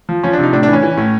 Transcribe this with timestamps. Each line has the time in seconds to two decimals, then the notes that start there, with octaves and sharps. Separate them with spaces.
0.09 F3
0.23 F3 C#4
0.33 D4
0.38 C3
0.43 D#4
0.53 A2 D4
0.63 D4
0.68 E3 C#4
0.83 E3
0.97 A2